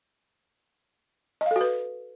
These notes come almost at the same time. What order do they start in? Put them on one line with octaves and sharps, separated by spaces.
D#5 F5 A4 F#4 B4